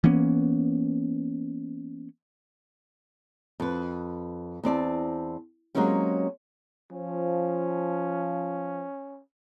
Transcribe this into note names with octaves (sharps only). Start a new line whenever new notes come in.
E3 A#3 B3 C#4
F2 B4
E2 C4 D5 A5
F#3 G#3 A#3 C4 C#4 G4
F3 C#4